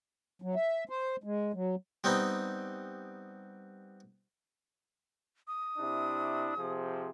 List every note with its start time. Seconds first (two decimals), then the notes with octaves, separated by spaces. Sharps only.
0.42 F#3
0.55 E5
0.89 C5
1.24 G#3
1.54 F#3
2.04 G3 B3 C4 D#4
5.48 D#6
5.78 C3 D4 E4
6.57 C3 F3 G#4